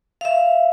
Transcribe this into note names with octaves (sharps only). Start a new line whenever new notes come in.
F5
E5